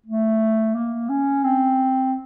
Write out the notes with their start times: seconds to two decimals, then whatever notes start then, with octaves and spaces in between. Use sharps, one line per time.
0.06 A3
0.75 A#3
1.09 C#4
1.44 C4